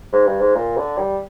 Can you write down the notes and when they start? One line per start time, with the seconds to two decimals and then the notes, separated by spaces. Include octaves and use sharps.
0.13 G#2
0.26 G2
0.40 G#2
0.55 A#2
0.77 D3
0.98 G3